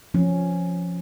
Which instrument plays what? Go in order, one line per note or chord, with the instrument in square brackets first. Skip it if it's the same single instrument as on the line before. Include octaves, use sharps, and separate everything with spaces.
[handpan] F3 C#4